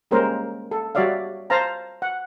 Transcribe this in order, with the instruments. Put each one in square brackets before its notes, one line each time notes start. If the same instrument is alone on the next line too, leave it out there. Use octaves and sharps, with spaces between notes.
[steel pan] G3 G#3 A#3 C#4 A#4 C5
A4
G3 F#4 C#5 D5 E5 F5
C5 F5 A5 A#5
F#5